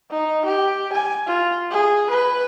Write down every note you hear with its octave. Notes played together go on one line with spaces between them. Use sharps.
D#4
G4
G#5
F4
G#4
B4